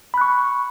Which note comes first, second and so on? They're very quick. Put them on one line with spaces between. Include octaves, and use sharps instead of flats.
B5 F#6 C#6